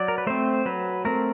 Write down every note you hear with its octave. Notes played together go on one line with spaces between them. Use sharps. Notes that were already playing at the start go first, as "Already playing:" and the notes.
Already playing: F#3 D5
A#4
B4
A3 C4 C5
F#3 B4
A3 C4 A#4